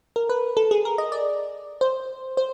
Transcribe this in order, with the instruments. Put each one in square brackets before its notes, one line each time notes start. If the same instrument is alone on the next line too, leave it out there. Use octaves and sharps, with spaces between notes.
[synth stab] A#4
B4
A4
G#4
A#4
D#5
D5
C5
C5